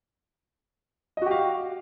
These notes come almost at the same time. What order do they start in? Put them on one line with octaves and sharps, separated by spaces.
D#5 F#4 G4 F5